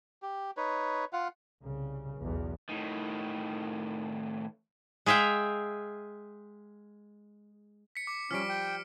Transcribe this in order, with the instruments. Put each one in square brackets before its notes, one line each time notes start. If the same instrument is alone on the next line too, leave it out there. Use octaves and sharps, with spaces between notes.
[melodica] G4
D#4 B4 C#5
F4 F5 F#5
[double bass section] C2 C#3
B1 E2
[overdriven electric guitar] A2 D#3
[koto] G#3 G#4 E5 F5 G5
[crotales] B6 C#7
D6
[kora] F3 G3 [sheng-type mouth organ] C#4 [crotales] F6 B6 D7
[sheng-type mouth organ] G5